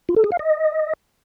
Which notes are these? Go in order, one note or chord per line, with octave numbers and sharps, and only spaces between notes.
F4
A4
G#4
F5
D#5